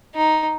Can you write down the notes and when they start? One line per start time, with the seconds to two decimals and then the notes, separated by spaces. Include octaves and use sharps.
0.14 D#4